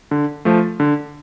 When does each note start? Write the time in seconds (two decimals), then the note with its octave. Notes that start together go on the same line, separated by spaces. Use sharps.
0.11 D3
0.45 F3 A3
0.80 D3